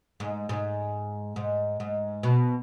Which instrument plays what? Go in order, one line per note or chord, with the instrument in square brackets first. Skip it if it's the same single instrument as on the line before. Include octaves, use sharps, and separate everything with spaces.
[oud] G#2
G#2
G#2
G#2
B2